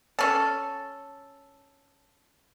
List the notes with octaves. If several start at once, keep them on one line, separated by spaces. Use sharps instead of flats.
C#4 A4